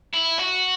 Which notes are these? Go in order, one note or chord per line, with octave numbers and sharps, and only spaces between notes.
E4
F#4